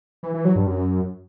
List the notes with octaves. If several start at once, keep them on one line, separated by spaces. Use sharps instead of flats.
E3
E3
F#3
G2
F#2